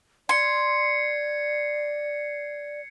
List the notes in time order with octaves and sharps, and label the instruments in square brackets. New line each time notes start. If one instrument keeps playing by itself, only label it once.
[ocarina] D5 [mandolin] C6 [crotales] G#6 C7 C#7